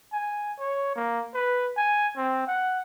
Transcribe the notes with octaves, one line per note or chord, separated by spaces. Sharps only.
G#5
C#5
A#3
B4
G#5
C4
F#5